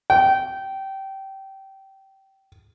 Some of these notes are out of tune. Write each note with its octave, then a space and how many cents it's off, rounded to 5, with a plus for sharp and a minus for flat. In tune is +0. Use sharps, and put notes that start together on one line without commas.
G5 -20